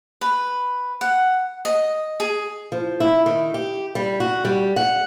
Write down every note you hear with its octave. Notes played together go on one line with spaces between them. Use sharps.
B4
F#5
D#5
G#4
F3
E4
D#3
G4
G3
F#4
G3
F#5